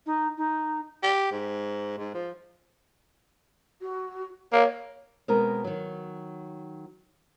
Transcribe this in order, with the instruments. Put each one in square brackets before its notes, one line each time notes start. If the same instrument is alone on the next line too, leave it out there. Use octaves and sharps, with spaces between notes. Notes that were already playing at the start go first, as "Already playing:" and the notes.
[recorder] D#4
D#4
[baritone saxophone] G4
G#2
G#2
F3
[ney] F#4
[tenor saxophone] A#3 [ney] C#5
[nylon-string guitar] B2 G#3 B3 C4 A#4
D#3 F#3